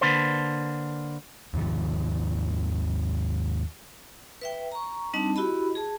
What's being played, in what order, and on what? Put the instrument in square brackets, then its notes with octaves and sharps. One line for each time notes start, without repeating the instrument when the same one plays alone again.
[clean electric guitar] D3 A#3 D4 B4 C5
[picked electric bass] D#2 G#2 D#3 F3
[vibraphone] B4 E5 G5
A#5 C#6
G3 C4 D4 D#4 D#5 A5
E4 F#4 G4 D#5 B5
G#4 A5